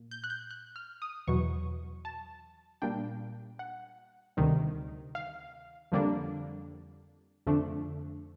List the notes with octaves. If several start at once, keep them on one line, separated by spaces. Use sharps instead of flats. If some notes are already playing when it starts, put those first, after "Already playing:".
Already playing: A#2
G6
F#6
G6
F#6
F6
D#6
E2 B2 F#3 C#6
A5
A#2 G3 A#3 D4 G5
F#5
D2 C3 D#3 G3
F5
F2 D3 G3 A#3 D4
F2 D3 F3 A3 D4